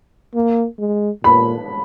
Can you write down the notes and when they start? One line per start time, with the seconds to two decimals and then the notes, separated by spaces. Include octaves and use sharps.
0.35 A#3
0.79 G#3
1.24 A#2 B5